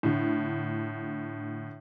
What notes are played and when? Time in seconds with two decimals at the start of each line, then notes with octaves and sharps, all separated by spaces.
0.03 A2 D3